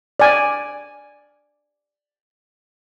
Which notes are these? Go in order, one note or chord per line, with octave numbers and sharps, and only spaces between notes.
D5 G#5